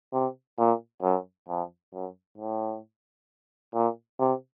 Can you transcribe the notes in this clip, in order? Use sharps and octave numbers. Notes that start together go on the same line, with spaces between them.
C3
A#2
F#2
F2
F#2
A2
A#2
C3